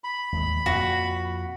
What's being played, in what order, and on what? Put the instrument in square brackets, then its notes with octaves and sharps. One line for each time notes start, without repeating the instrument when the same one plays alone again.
[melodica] B5
[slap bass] D#2 A2 G#3
[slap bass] F2 A#2 [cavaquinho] F#4